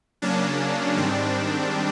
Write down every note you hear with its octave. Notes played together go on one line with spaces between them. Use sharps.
C#3 F#3 A#3 C#4 D4
G#2 D#3 G3 C4